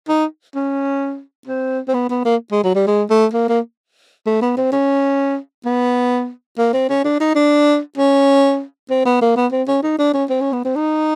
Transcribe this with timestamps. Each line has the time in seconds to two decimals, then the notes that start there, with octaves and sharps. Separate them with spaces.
0.09 D#4
0.55 C#4
1.47 C4
1.88 C4
1.94 B3
2.10 B3
2.25 A#3
2.52 G#3
2.64 F#3
2.75 G3
2.87 G#3
3.10 A3
3.34 A#3
3.49 A#3
4.26 A3
4.42 B3
4.57 C4
4.72 C#4
5.65 B3
6.58 A#3
6.74 C4
6.90 C#4
7.05 D4
7.20 D#4
7.35 D4
7.98 C#4
8.90 C4
9.05 B3
9.21 A#3
9.36 B3
9.52 C4
9.68 C#4
9.83 D#4
9.99 D4
10.14 C#4
10.30 C4
10.41 C#4
10.53 B3
10.65 C4
10.76 D#4